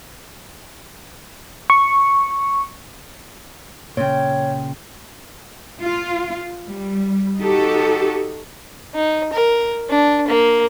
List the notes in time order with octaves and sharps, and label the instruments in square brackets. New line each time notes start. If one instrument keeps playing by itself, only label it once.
[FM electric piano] C#6
[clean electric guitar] A#2 C#3 [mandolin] F4 G5 [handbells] C#5
[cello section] F4
G3
D#4 F#4 G4 A4
[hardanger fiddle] D#4
A#4
D4
A#3